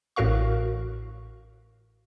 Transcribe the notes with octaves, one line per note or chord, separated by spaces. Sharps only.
A1 A2 F#4 A#4 F5 C#6